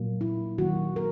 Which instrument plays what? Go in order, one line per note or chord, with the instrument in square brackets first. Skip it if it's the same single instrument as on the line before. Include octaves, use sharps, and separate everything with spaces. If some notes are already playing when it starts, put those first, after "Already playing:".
Already playing: [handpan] A#2 F#3 A#3
E4
D#3 F#3 A#3 F#4
A#4